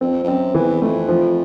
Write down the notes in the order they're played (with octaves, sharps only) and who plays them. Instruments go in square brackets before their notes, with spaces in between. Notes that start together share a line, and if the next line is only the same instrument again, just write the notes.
[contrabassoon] F2 [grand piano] C4
[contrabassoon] F2
[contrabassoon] F#2 [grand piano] C4
[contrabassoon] E2 [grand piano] E3
[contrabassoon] F2 [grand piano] A3
[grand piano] F3